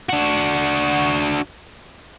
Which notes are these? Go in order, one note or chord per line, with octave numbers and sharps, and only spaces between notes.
D4 F#4